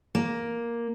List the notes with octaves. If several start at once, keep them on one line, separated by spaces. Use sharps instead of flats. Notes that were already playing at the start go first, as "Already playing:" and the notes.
A#3